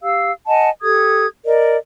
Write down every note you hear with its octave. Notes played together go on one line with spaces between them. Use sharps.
G4 F5 E6
D#5 F#5 G#5 A5
G4 A4 D#6 G#6
A#4 D5 D#5